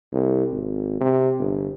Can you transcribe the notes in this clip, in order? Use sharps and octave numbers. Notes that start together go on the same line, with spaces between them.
C2
G#1
C3
G1